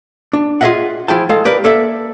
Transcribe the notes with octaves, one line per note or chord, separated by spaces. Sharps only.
D4
F4 G#4 A#4 D#5 E5 F#5
F3 E4 G#4 G5 A5
G#3 A4 F5
G4 A#4 B4 D5
A#3 A4 D5 E5